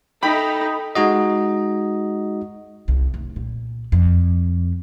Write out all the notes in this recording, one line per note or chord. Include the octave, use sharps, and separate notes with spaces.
D#4 A4 G5 B5
G#3 D#4 F#4 D#5
C2
F1
A#2
F2